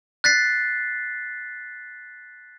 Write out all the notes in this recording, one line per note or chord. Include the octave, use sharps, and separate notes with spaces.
F#6 A6 B6 C7